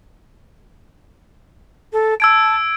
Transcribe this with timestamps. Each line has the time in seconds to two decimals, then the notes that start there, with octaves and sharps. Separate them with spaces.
1.92 A4
2.20 A5 E6 G#6 D7